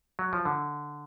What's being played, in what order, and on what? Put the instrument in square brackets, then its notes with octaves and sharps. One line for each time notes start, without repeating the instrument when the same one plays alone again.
[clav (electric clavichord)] F#3
F3
D3